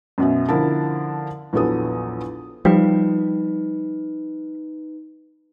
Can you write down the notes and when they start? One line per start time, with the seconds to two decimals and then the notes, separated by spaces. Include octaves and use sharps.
0.18 F#2 B2 E5
0.49 D3 F3 E4 A#4 A5
1.53 A#1 E2 F#3 B3 A4 D#6
2.65 F3 G3 D#4 B4